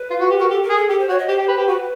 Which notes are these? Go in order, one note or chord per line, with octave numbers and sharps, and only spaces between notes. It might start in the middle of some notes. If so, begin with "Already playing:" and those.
Already playing: B4
F4
F#4
G4
F#4 A#4
G4 A4
A#4
G#4
A4
G4 A4
C5
F#4 C#5
D#5
G4 C5
G4
B4
G4
F#4 B4